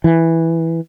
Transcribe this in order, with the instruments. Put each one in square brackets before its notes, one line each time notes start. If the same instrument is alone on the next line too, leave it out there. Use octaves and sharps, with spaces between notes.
[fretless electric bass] E3